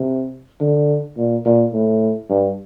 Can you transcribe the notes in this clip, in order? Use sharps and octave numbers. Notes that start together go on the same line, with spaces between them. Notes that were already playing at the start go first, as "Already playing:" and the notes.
Already playing: C3
D3
A#2
A#2
A2
G2